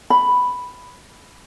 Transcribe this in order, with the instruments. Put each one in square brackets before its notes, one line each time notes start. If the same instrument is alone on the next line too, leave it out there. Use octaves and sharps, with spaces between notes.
[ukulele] B5